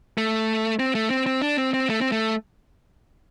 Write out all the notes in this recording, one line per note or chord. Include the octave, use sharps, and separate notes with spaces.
A3
C4
A3
C4
C4
D4
C4
C4
A3
C4
A3